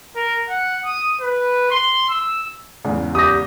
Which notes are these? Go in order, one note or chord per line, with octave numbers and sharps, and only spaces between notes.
A#4
F#5
D#6
B4
C6
E6
E2 G#2 C#3
G4 D#6 A#6